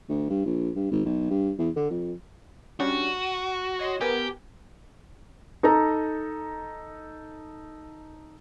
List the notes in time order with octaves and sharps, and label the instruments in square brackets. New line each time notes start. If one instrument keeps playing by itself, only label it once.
[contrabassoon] D2
G2
A#1
G2
G#1
B1
G2
E2
D3
F2
[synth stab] G3 C#4 D4 [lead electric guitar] F#4
[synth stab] D#7
C#5 D#5 C6
[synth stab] B3 A#4 G#5 [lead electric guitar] G4
[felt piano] D#4 A4 A#5